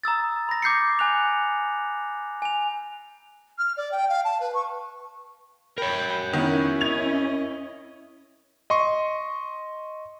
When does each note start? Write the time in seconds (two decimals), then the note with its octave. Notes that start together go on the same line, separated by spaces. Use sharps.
0.04 A#5 D#6 E6 A6
0.49 B5 A#6
0.62 D6 G6 C7 C#7
0.99 G#5 F#6 F7
2.42 G#5 F7
3.58 F6
3.77 D5
3.91 G5
4.09 F5
4.24 A5
4.40 B4
4.54 C#6
5.78 A#4 C#5 G5 B5
6.33 D#3 B3 C#4 E4 F#5
6.81 D#5 G#6 F7
8.70 D#5 C6 C#6